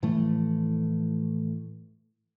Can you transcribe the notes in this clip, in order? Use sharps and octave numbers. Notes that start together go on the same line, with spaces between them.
A2 E3 F3 A3